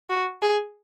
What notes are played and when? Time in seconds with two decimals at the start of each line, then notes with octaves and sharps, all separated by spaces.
0.10 F#4
0.42 G#4